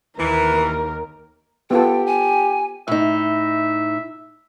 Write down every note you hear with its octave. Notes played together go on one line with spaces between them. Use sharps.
D#2 E3 A#4
B3 F4 G4 A4 G5
G#5
A2 D#4 E5